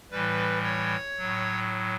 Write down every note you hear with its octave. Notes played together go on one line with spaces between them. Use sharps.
A2 E3 G3 B4
C#5
A2 F#3